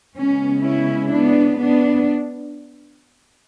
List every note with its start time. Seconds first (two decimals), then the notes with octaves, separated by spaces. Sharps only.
0.17 C#3 G#3 B3 C#4
0.63 C#4 E4
1.10 B3 D4
1.57 B3 D4